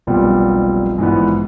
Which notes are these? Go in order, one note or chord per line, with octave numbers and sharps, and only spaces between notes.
F1 B1 A#2 G3 B3
A#1 G#2 E3 B3